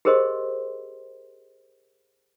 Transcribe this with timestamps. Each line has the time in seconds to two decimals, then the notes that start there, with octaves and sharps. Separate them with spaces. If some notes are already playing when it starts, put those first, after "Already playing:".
0.05 G4 G#4 A#4 C5 D#5 C6